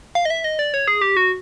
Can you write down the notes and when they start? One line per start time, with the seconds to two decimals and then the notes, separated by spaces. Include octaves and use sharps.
0.15 F5
0.25 D#5
0.30 E5
0.44 D#5
0.59 D5
0.74 C#5
0.88 G#4
1.01 G4
1.17 F#4